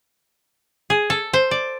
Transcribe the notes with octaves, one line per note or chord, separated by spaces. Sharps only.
G#4
A4
C5
D5